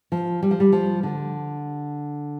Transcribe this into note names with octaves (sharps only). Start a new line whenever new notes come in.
F3
G3
F3
G3
F3
D3